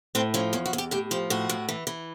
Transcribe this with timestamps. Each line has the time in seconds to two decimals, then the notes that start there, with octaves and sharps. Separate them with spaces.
0.15 A2 C4
0.34 F3 C#4
0.53 E2 C#4
0.66 F#4
0.73 E2
0.78 G4
0.91 A2 G4
1.11 F3 G4
1.30 A2 F#4
1.49 A2
1.69 E3
1.87 E3